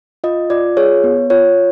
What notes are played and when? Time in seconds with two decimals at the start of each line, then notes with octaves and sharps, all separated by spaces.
0.24 F4 D#5
0.50 F4 D5
0.77 G#4 C#5
1.04 B3
1.30 F4 C#5